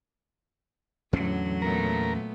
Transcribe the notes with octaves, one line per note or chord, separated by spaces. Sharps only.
E2 A2 D3 F#3 C#4
A#2 A3 B3 A#4